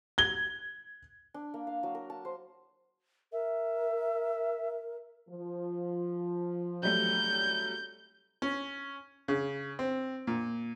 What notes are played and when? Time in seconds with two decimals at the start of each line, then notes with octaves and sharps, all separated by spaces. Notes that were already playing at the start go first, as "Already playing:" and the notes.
0.18 G#6 G7
1.34 D4
1.54 A#3
1.67 F5
1.83 F#3
1.95 A#4
2.10 A5
2.25 C5
3.33 A#4 E5
5.30 F3
6.83 F#3 G3 A3 G6
8.42 C#4
9.28 C#3
9.79 C4
10.27 A#2